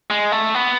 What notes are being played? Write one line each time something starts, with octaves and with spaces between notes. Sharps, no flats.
G#3
A3
B3